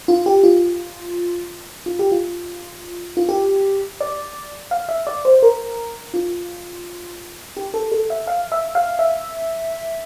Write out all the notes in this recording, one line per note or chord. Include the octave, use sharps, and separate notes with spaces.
F4
G4
F4
F4
G4
F4
F4
G4
D5
F5
E5
D5
C5
A#4
F4
G4
A4
A4
E5
F5
E5
F5
E5